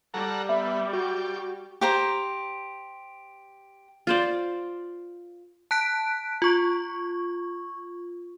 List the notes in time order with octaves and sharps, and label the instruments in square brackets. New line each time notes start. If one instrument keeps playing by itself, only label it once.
[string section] G3 [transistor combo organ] A4 F#5 A#5
[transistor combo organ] B3 [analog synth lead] E5
[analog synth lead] F#4 [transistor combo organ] G4
[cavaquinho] G4 C5 A#5
[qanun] F4 C5 D5
[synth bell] A5 F#6 B6 D7
F4 C#6